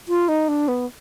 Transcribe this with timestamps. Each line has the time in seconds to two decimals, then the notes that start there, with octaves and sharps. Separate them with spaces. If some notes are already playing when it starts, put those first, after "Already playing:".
0.08 F4
0.28 D#4
0.48 D4
0.68 B3